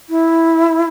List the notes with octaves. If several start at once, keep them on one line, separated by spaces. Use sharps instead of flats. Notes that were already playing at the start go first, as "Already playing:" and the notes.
E4